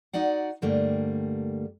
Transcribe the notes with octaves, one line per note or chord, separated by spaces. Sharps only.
D#4 F#4 D5 F#5
G2 D3 G3 A3 A#3